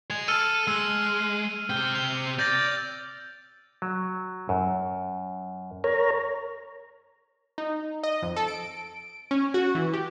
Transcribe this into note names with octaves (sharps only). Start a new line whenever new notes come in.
D#5 G#5 F7
A4 A5 E6 F6 D#7
G#3 E6
C3 G5
F7
D5 G6 A6 A#6
F#3
F#2
A#4 C#5 A#5
D#4
D#5
F2
A4
D7
C#4
F#4
E3
G4